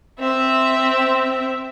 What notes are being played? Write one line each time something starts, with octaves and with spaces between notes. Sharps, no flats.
C4 E5